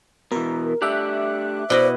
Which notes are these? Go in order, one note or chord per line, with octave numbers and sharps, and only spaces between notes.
B2 E3 A#4
A3 D4 G4 E5 D6 F#6
B2 E4 C5 D5 D#5